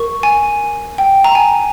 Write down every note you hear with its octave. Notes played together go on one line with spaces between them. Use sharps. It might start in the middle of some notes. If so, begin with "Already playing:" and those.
Already playing: A#4 C#6
G#5
G5
A#5
G#5